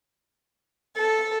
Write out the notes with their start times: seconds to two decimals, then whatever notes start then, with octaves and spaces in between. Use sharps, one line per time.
0.95 A4